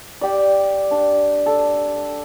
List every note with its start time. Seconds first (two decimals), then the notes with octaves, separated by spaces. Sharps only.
0.21 G4 D5
0.91 D4
1.46 A4